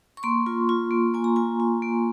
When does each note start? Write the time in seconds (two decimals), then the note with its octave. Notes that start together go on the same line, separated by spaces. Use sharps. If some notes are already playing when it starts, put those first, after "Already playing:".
0.17 C#6
0.23 A#3 C6
0.46 F4
0.69 F4
0.91 A#3
1.14 A#3 G#5
1.24 A#5
1.36 F4 G#5
1.60 F4
1.82 A#3